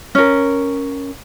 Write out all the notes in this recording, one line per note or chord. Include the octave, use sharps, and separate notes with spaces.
C#4 A#4